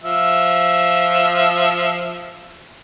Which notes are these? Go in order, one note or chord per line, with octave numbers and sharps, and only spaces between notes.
F3 E5